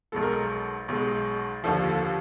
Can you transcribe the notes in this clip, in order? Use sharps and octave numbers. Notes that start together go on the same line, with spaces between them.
B1 B2 G#3 A4
A#4
A4
B1 B2 G#3
D#2 D3 F3 A4
A4